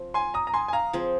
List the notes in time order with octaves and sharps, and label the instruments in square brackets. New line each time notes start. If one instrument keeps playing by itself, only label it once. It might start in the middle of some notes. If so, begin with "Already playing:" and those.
Already playing: [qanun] F3 C4
[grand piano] G#5 C6
A#5 D#6
A#5
G#5 C6
G#5
F5 A#5
[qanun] F3 C4 G#4